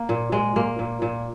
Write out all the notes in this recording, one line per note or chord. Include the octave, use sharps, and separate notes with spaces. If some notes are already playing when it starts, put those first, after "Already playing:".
Already playing: A#3
A#2
A#2 G#3
A#2 A#3
A#2
A#2